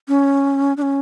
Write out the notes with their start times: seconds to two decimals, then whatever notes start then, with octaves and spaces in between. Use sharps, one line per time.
0.08 C#4
0.77 D4
0.82 C#4